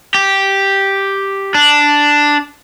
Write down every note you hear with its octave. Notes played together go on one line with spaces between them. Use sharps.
G4
D4